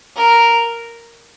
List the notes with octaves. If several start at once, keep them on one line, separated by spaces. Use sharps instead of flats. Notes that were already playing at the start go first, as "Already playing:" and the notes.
A#4